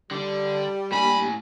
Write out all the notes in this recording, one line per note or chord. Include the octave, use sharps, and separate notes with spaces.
D3 G3 D4
A2 A#3 D4 G4 G#5 B5